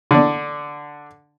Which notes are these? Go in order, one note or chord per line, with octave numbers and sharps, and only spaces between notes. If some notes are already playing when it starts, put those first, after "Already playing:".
D3 D4